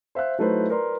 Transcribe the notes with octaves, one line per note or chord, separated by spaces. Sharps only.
C5 E5 F5 F#6
F#3 A3 D#4 E4 B4 C5
A#4 B4 D5 C6